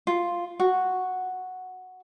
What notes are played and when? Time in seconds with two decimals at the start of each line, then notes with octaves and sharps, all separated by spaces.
0.07 F4
0.60 F#4